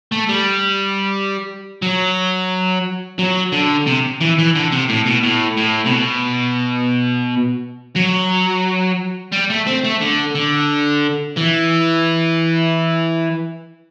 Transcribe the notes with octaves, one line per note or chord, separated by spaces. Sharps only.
A3
G3
F#3
F#3
D3
C3
E3
E3
D3
C3
A2
B2
A2
A2
C3
B2
F#3
G3
A3
C4
A3
D3
D3
E3